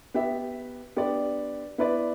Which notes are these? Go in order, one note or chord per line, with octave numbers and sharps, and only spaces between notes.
B3 G4 E5
B3 D4 G4 D5
B3 E4 B4 D5